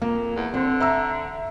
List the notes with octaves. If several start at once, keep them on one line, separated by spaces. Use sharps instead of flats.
F2 A#3
E2
D3 C4
E5 A#5 E6